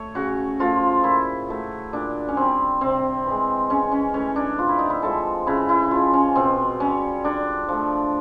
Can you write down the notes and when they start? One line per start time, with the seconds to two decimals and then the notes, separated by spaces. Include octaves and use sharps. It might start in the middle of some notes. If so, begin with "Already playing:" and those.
Already playing: A3 C#5
0.15 C#3 F#4
0.59 F3 A3 F4
1.04 A#2 E4
1.48 F#3 A3
1.93 A#2 D4
2.29 C#4
2.37 G3 C4
2.81 C3 C4
3.26 E3 G#3
3.70 C#3 C#4
3.92 C#4
4.14 E3 A3 C#4
4.36 D4
4.58 C3 F4
4.69 E4
4.79 D#4
4.90 E4
5.02 F3 G#3 A4
5.47 C#3 E4
5.69 E4
5.91 F3 G#3 F4
6.13 C#4
6.35 B2 C4
6.80 G3 C#4
7.24 D3 D4
7.68 F3 A3